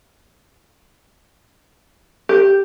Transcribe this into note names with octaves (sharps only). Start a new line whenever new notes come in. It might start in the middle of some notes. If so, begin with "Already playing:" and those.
G4